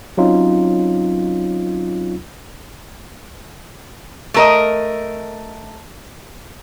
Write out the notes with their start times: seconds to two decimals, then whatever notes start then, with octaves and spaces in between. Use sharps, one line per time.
0.17 F#3 C4 C#4 D#4 F4
4.34 A3 A#4 D#5